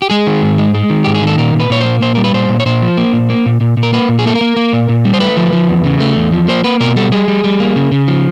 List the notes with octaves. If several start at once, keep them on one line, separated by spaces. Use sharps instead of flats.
G4
G#3 G#4
D#3
G#2
G#3
G#3
D#3
G#2 G4
G#4
D#3 A4
A#2 A#4
A#2
B4
A#2 C#5
A#3 C5
A#2 C5
G3 A#4
B4
A#2 C5
A#2
C#5
A#2 C5
F3
A#3
A#2
A#3
A#2
A#2
A#2
A#4
A#3 B4
A#2
G#4
A#3 A4
A#4
A#3
A#3
A#2
A#2
G3
C5
A3 B4
F3
F3
E2
C#3
A3
E2
F3
A#3 C5
A#3 B4
B2 A#4
G3 A4
G3 G#4
G3
G3
A#3
C#3
C#3
F3